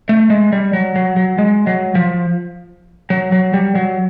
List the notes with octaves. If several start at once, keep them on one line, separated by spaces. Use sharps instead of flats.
A3
G#3
G3
F#3
F#3
F#3
G#3
F#3
F3
F#3
F#3
G3
F#3